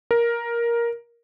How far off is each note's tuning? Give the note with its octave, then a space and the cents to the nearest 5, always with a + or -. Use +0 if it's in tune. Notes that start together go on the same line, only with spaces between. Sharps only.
A#4 +10